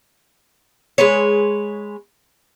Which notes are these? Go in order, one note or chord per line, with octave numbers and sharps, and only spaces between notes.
G#3 B4 C#5